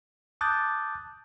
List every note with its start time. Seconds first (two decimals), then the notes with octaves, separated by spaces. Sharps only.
0.41 A5 D6 D#6 F#6 G6 A6